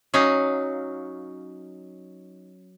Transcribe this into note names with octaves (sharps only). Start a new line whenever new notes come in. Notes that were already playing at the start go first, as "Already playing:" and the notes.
F#3 C#4 D#4 F5